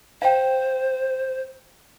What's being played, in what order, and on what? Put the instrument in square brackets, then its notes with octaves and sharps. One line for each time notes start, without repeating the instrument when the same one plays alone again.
[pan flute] C5 [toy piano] F5 G5